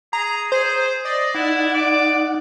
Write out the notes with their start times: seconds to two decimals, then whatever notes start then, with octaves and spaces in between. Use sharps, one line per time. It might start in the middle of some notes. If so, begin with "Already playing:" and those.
0.13 G#4 A#5
0.52 G#4 C5
1.05 D5 D#5
1.34 D#4 E4 F#5
1.75 D6